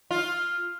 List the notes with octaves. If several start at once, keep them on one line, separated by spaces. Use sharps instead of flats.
F4